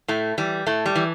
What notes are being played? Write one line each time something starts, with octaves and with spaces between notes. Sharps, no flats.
A2 A3
E3 G3
A2 A3
G3
E3